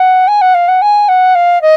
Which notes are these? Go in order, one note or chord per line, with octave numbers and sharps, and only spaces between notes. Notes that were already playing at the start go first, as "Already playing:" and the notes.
Already playing: F#5
G#5
F#5
F5
F#5
G#5
F#5
F5
D#5